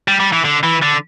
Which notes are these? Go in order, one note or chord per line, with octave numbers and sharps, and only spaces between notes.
G3
G3
E3
D3
E3
D3